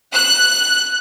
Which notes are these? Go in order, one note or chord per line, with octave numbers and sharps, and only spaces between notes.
F#6